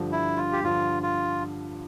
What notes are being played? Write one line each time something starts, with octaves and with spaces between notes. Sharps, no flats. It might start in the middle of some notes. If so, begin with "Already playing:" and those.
Already playing: G2 D3 F3
E4
F4
G4
G2 D3 F3 F4
F4